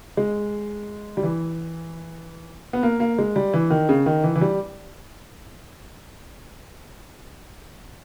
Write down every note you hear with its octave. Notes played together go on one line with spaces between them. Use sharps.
G#3
G3
E3
B3
A#3
A#3
G#3
G3
E3
D#3
C#3
D#3
E3
E3
G3